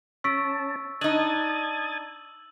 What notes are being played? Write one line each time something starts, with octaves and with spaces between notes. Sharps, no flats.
C#4 A5 C#6 E6 B6 D7
D4 D#4 D#6 G#6 A6 F#7